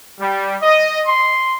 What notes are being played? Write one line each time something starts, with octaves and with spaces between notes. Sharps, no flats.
G3
D#5
C6